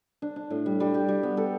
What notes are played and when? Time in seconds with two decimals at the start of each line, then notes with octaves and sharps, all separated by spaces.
0.22 D4
0.36 D4
0.50 A2
0.66 G3
0.80 G3
0.94 G4
1.08 G3
1.23 B3
1.37 A4